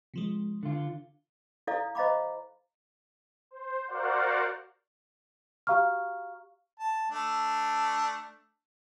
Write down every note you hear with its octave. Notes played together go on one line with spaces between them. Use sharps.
C3 F3 G#3
D3 F4
E4 A4 D5 F5 A#5 D#6
C5 D#5 F5 A#5 B5 D6
C5
F#4 A#4 C5 D5 F5 F#5
F#4 G4 F5 A#5 C#6 F6
A5
A3 D4